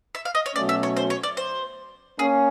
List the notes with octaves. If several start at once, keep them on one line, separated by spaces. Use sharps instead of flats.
E5
F5
D#5
C#5
B2 F#3 A3 C#4 D5
E5
C#5
C5
C#5
D5
C5
A#3 C#4 G#4